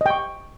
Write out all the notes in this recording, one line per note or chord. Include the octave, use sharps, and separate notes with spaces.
D#5 G5 C#6